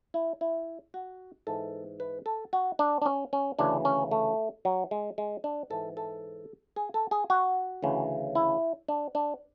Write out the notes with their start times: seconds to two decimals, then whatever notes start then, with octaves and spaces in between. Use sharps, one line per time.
0.14 E4
0.41 E4
0.94 F#4
1.47 G#2 E3 A4
2.00 B4
2.26 A4
2.53 F#4
2.79 D4
3.02 D4
3.06 C#4
3.33 C#4
3.59 D2 C#3 E3 D4
3.85 C#4
4.11 A3
4.65 F#3
4.91 G#3
5.18 G#3
5.44 D4
5.70 G#2 E3 A4
5.97 A4
6.76 G#4
6.94 A4
7.11 G#4
7.30 F#4
7.83 D2 C#3 E3
8.35 E4
8.89 D4
9.15 D4